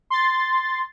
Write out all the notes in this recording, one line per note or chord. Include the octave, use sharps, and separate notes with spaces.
C6 A6